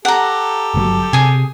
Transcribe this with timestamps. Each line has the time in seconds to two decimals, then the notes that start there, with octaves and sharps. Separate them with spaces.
0.05 G4 A4 F#5 A#5
0.74 G1 C3 F#3
1.13 C3 G#4 G#5